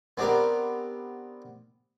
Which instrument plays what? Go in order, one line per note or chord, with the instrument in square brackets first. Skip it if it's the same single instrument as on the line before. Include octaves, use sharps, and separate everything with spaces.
[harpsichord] B3 C4 D4 G4 A#4